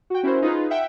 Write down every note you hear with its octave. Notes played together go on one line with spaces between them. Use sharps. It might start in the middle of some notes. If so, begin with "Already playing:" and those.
F#4 G5
C#4 E4 F#4 A#4 C5
D#4 F4 G#4 B4
E5 F#5 G5